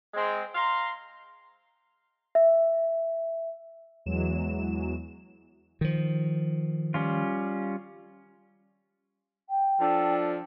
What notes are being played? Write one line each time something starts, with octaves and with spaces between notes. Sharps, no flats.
G#3 C4
F5 A#5 C6
E5
E2 E3 F#3 G#3 E7
D#3 F3
G3 C#4 F4
G5
F3 D4 A4